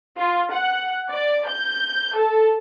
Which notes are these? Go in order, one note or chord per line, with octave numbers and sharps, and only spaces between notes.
F4
F#5
D5
G6
A4